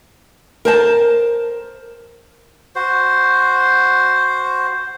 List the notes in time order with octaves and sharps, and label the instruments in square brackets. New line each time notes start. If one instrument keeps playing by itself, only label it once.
[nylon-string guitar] A#4 C5 A5
[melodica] F#4 C5